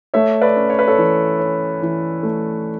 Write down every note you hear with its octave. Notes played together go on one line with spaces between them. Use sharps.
A3 C#5 E5
B4 D5
C#4
C#5
B4
A4 C#5
E3
C#4
E3
A3